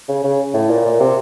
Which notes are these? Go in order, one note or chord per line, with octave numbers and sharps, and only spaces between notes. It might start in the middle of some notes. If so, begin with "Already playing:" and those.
C#3
C#3
A2
A#2
A#2
C3